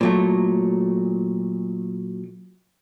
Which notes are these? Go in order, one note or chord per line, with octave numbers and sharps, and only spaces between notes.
A#2 F#3 A3